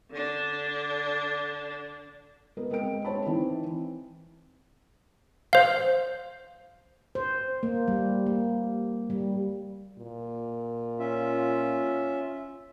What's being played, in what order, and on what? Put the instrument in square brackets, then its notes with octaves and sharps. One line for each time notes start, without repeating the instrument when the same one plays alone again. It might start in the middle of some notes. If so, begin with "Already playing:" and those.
[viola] D3 D4
[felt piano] G#3 B3 A#4
G#3 C4 A#4 G5 D7
G#3 C5 C#5 A5 B5
E3 C4 D#4
[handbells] C5 F5
[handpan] C5
A#3
G3
A#3
G3
[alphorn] A#2
[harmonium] C#4 F4 E5